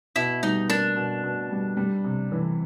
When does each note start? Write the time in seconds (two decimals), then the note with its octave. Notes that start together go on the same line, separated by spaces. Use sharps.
0.16 B2 E4
0.43 G3 D#4
0.69 A#3 D4
0.96 B2
1.23 B2
1.51 G3
1.77 G3
2.04 C3
2.32 E3